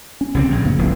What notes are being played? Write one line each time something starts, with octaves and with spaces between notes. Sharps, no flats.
C#4
C2 D3 C4
A#1 A2
F#2 C#3 A#3
F1 C2 A2